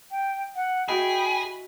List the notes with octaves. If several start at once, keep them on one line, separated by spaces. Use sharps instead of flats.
G5
F#5
E4 F#4 G#4 D#5 G5 B5